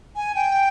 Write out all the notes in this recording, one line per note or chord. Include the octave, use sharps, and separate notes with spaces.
G#5
G5